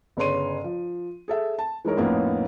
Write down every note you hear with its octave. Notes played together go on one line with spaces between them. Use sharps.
G1 C#3 B4 C#5 C6 D#7
F3
G#4 A4 E5
A5
E3 G#3 D#4 A#4 C#5
F2 A2 A#3 B3 C#4 D#4